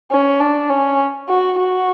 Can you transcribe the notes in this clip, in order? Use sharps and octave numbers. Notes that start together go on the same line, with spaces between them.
C#4
D4
C#4
F#4
F#4